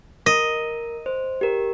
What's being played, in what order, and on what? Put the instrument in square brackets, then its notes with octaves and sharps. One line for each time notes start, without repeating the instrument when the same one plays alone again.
[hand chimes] A#4 [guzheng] D#5
[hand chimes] C5
G4 A#4